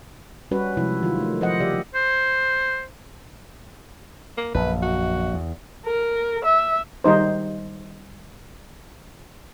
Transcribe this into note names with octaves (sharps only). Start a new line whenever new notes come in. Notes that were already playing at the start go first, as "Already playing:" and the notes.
G3 C#4 F#4 B4
C3 F3 G#3 E4
D#3 F#3 F4
A3
F3 C5 D#5 F#5
C#3 G4 D5 E5
C5
A#3
A#1 F#2 B4
F#4
E2
A#4
E5
D#3 G3 D#4 C5